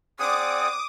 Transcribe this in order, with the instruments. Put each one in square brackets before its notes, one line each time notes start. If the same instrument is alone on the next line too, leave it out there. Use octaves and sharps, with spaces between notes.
[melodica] C4 G#4 F#5 [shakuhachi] D5 [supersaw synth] D6 D#6